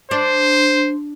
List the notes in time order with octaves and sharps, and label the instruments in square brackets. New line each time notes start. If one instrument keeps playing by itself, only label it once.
[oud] D4 [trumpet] C5